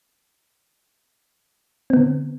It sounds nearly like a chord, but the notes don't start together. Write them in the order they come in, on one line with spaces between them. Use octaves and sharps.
C4 B3 D3